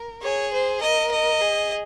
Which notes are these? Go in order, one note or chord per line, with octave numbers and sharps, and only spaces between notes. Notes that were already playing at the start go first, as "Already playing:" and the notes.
Already playing: A#4
G#4 C#5
C5
A#4 D#5
D#5
G#4